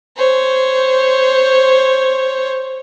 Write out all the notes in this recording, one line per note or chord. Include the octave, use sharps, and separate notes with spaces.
C5 C#5